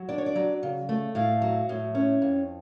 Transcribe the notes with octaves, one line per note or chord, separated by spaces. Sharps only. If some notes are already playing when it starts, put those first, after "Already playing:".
Already playing: F#3
D4 D5
C#5
D5
F#3
C#3
A3
A2 F5
F#3
A2
C#4
F2